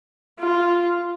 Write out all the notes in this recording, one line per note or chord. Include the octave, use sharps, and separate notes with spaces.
F4